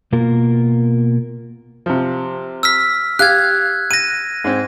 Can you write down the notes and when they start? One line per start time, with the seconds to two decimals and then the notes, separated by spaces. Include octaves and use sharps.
0.12 B2 A#3 F4 A#4
1.86 C3 F3
2.63 E6 F6 B6
3.19 G4 F5 F#6 G#6
3.91 F#6 A#6 D#7
4.44 G#2 C4